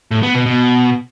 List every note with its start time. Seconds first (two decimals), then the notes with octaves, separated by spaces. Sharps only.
0.11 A2
0.23 B3
0.34 B2
0.46 B2